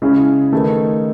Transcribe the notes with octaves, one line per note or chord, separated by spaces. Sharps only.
C#3 G#3 C#4 E4 G#4
D#3 A3 D#4 G#4 B4